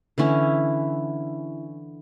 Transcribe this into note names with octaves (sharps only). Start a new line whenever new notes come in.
D3 E3 C#4 E4